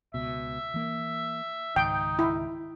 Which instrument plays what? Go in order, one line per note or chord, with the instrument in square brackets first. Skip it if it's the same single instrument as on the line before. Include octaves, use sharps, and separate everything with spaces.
[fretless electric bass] C#2 B2 [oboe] E5
[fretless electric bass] E3 A#3
[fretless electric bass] C#2 G#2 D#3 [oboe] D#4 [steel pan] G5
[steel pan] E4